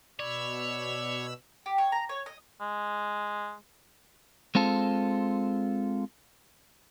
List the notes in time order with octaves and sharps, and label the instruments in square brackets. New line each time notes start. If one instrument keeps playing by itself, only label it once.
[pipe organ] B2 B5 E6 [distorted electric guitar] C#5 [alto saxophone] D5
[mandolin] G4
C#5
A#5
C#5
D#5
[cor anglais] G#3
[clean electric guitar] G#3 C4 F4 A4